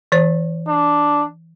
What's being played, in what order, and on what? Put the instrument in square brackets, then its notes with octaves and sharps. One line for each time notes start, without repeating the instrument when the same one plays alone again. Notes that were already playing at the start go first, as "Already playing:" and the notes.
[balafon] E3 C5
[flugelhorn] D4